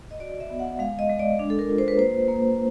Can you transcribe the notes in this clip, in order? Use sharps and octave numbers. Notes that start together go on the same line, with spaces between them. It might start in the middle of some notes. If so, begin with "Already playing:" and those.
D#5
F#4 D5
E5
B3
F#5
G#3 F5
D#5
G#3
D5
D4
A4
A#4
F4
C5
B4
A#3 C5
A#3